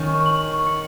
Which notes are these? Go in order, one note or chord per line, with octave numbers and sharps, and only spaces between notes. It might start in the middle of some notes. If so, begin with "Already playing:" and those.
Already playing: D#3 C#4 D#4 C#6
F#7
C#7